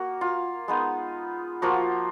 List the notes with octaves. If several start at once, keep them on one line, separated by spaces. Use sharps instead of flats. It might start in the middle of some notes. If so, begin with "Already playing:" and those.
Already playing: A#3 F#4
F4
G#3 B3 D#4
F3 A#3 F4 F#4